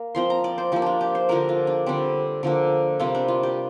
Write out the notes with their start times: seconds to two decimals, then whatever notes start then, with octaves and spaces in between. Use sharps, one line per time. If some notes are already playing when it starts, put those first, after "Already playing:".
Already playing: A#3
0.15 F3 C4 C6
0.30 A#5
0.44 D5
0.58 C5
0.72 F3 A#3 G4
0.82 D4 F4
1.01 G4
1.15 C5
1.29 D3 F3 A#3 A#4
1.49 F4
1.67 D4
1.86 D3 G3 C4
2.43 D3 F3 A#3
2.99 C3 G3 A#3 F4
3.15 D4
3.28 F4
3.43 G4